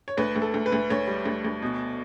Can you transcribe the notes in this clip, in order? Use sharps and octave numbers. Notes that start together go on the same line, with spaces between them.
C#5
D2 B4
D2
A4
D2
B4
D2
D2 C#5
G3
D2
D2
B2